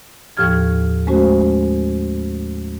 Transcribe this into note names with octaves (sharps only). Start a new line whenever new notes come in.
D#2 A2 F3 G4 F6 G#6
G#3 A3 C#4 F#4 C5